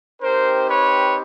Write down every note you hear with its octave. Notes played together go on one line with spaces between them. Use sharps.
C4 D#4 G4 A#4 C5
B4 C#5